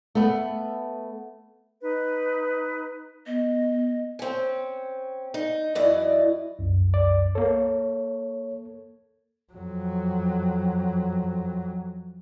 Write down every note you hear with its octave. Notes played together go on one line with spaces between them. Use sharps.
A3 B3
D#4 B4
B3 D#5
C4 C#4
D#4
F#2 E3 E4 D5 D#5
C2 F#2
D5
A#3 A4 C#5
F2 F#3